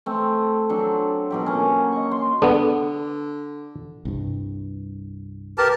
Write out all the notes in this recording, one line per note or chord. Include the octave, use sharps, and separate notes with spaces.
A3 C4
F#3 C4 D4 A4
B2 F#3 G4
A#3 C#4
D#5 C#6
C6
D3 B3 D4 A4 D6
C2 G2
G4 A#4 B4 A5